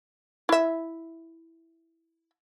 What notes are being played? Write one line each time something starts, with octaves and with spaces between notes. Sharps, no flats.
E4 E5